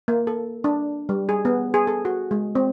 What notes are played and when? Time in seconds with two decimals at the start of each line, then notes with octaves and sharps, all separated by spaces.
0.08 A#3
0.27 A4
0.64 D4
1.09 G3
1.29 G#4
1.45 B3
1.74 G#4
1.87 A4
2.05 F#4
2.31 G#3
2.55 C4